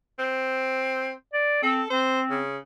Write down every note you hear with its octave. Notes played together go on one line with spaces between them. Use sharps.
C4
D5
C4 A4
C4 C5
C#3